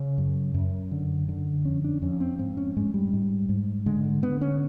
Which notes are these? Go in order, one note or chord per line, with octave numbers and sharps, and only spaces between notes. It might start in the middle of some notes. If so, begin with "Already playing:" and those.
Already playing: C#3 C#4
F#2
F#2
D3
D3
F2 C#4
D4
F2 C#4
C4
G#2 C4
C#4
G#2 G#3
G3
G#2
G#2
D3 G#3
D3 B3
C#4